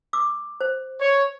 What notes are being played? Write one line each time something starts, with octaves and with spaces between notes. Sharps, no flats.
D6 E6
C5
C#5